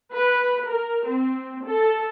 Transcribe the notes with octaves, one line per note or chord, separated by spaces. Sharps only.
B4
A#4
C4
A4